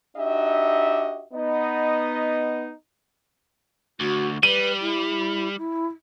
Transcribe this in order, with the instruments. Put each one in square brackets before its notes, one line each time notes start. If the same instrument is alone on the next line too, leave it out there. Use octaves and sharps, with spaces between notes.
[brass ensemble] D4 D#4 F#4 G4 D#5 E5
B3 D#4 D#5
[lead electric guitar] D2 [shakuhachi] F#4
[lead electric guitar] G3 [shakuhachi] B4 [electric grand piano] D#7
[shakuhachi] E4
E4